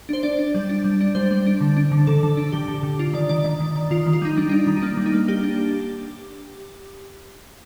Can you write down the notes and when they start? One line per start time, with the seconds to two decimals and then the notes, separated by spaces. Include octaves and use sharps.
0.09 D4 C5
0.23 D4 D5
0.39 D4
0.54 G3
0.69 D4
0.84 G3
1.01 D4
1.15 G3 C5
1.31 G3
1.46 D4
1.61 D3
1.77 D4
1.92 D3
2.07 D3 A4
2.23 D3
2.37 D4
2.52 D3 G4
2.68 D3
2.83 D3
2.99 D4 F4
3.13 D#3 D5
3.29 D#3 D5
3.44 D#3 D5
3.60 D#3
3.76 D#3
3.91 D#3 F4
4.06 D#3
4.13 F4
4.22 G3 D#4
4.37 G3 D4
4.49 D4 D#4
4.67 D#3
4.77 D#4
4.82 A#3 D4
4.97 G3
5.06 D#4
5.14 A#3
5.28 A#3 G4
5.44 D4